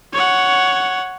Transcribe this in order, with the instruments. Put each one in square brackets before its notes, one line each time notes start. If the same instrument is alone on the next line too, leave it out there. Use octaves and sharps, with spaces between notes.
[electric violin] C#5 F#5